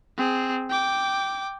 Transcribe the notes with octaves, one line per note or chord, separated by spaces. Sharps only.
C4 G#4
G5 D6